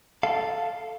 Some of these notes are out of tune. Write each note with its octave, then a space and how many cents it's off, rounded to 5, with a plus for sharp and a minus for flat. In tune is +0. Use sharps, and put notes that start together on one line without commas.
A4 +0 F5 +0